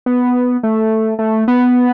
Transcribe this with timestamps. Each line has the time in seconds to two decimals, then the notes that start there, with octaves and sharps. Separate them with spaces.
0.06 B3
0.63 A3
1.19 A3
1.48 B3